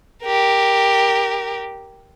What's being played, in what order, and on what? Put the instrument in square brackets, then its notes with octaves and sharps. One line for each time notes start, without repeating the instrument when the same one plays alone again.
[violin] G4 A#4